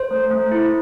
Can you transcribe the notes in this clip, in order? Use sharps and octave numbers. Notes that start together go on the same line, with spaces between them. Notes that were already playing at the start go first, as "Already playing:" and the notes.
Already playing: C5
A3
A3
E4